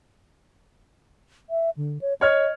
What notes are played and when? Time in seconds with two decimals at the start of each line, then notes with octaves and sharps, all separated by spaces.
1.50 E5
1.77 D3
2.02 C#5
2.21 C#5 D#5 F6 G#6